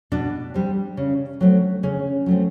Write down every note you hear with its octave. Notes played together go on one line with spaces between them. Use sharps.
B2 D4
G3 C4
C#3
F#3 A3 C4
C#3 C#4
F#3 A3 C4